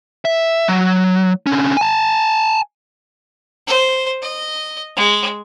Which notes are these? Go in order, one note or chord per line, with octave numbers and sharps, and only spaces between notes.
E5
F#3
D3 C#4
G#5 A5
C5
D#5
G#3